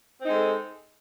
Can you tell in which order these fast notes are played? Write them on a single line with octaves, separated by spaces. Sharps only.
C4 D#4 G#3 A4